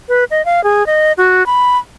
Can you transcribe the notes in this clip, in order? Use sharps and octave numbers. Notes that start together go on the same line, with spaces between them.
B4
D#5
F5
G#4
D#5
F#4
B5